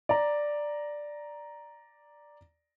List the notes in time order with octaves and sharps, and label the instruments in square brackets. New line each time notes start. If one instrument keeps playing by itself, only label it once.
[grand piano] D5 A#5